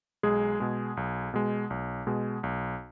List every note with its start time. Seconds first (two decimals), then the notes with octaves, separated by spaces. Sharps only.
0.23 B1 G#3 G#4
0.60 B2 G#3
0.97 B1
1.34 B2 G#3
1.70 B1
2.07 B2 G#3
2.43 B1